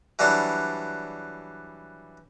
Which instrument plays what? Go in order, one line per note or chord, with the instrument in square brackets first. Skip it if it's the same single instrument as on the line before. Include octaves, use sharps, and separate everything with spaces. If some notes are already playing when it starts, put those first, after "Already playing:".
[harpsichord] E3 F#3 G3 D4 C5